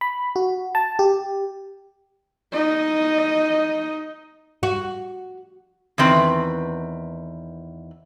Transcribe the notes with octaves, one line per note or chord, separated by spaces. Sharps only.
B5
F#4
A5
G4
D#4 D#5
F#4
E2 D#3 C4 B4